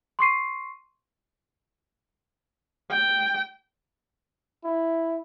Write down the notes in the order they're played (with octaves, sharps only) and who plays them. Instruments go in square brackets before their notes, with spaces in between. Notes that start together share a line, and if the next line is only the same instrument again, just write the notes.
[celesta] C6 C#6 C7 D#7
[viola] G5
[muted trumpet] E4